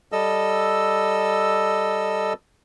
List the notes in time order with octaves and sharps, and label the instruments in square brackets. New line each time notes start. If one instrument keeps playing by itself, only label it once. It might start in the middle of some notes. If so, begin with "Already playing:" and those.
[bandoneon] G3 A4 D#5 E6